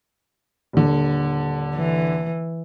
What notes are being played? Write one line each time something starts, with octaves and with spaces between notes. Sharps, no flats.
D#1 D3
E3